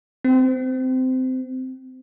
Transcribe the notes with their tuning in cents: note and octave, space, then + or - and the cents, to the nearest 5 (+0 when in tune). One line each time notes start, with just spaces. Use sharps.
C4 -20